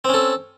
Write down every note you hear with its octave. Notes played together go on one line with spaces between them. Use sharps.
C4 C#4 A4